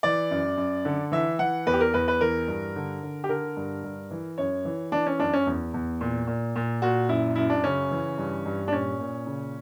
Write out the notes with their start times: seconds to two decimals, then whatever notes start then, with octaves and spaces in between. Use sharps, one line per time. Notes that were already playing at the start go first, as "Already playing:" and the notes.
0.03 E3 D5
0.31 F#2
0.57 F#2
0.85 D3
1.12 E3 E5
1.39 E3 F#5
1.67 E2 B4
1.74 G4
1.80 A#4
1.94 E2 B4
2.08 B4
2.21 E3 A#4
2.48 G2
2.76 D3
3.03 D3
3.24 G4
3.29 D3 A#4
3.57 G2
3.84 G2
4.11 E3
4.38 F#2 C#5
4.65 E3
4.92 E3 D4
5.06 C#4
5.19 F#2 D4
5.33 C#4
5.47 E2
5.74 E2
6.01 A#2
6.27 A#2
6.56 A#2
6.82 A#2 F#4
7.09 F#2 E4
7.35 F#2 E4
7.50 D4
7.64 C#3 C#4
7.91 E3
8.18 G2
8.46 G2
8.68 D4
8.72 A#2 C#4
9.00 A#2
9.26 C#3